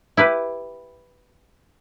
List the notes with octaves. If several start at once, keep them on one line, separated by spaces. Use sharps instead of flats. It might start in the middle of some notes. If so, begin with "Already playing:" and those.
E4 G4 B4